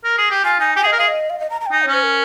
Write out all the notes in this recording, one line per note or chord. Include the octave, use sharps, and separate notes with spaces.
A#4
G#4
G4
F4 G#5
D#4 G#5
G4 G#5
G#4 D#5
A#4
G#4 F5
D#5
F5
D#5
A#5
A#5
G5
D#4 G#5
C#5
C#4 C5
A#4